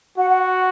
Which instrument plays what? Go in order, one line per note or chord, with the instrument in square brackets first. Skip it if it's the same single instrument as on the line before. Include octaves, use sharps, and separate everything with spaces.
[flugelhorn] F#4 [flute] F#5
[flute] F#5
F#5